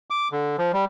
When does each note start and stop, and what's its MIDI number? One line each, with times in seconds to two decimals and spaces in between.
0.10 0.28 86
0.32 0.56 50
0.58 0.72 53
0.73 0.85 55